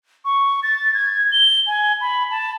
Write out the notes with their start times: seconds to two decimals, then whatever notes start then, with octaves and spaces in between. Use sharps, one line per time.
0.25 C#6
0.63 A6
0.94 G#6
1.32 G7
1.67 G#5
2.01 B5
2.31 A5